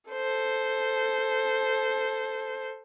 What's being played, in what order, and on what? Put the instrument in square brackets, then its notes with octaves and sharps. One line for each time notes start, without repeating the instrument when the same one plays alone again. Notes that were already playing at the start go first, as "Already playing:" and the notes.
[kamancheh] A4 C5